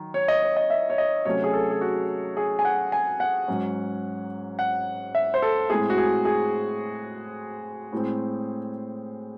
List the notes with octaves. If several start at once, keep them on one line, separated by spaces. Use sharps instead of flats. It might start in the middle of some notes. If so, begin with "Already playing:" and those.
Already playing: D#3 F#3
C#5
D#5
C#5
D#5
E5
C#5
D#5
C3 F#3 A3 C#4 C#5
G#4
A4
G#4
F#4
G#4
G#5
F#5
G#5
F#5
G#2 F#3 C#4
F#5
E5
C5
A4
A2 G#3 C4 G#4
F#4
G#4
G#4
A2 G#3 C4